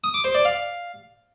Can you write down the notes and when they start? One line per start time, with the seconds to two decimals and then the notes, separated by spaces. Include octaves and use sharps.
0.04 D#6
0.14 D6
0.24 C5
0.35 D5
0.45 F5